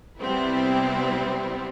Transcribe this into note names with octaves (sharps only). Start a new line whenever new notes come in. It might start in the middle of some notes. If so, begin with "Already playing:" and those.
C3 G3 B3 C4 E4